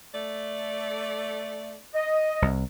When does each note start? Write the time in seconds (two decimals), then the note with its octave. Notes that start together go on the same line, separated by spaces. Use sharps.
0.14 A3 D5
1.95 D#5
2.42 C2